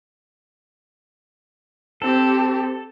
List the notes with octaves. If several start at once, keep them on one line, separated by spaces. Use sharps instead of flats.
C4 G4 A4